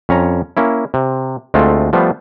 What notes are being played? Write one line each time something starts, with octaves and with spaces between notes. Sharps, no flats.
F2 C#4 C#5 A#5
A#3 C#4 E4
C3
D2 G#3 A3 C4 F4 A4
F3 G3 A3 B3 C5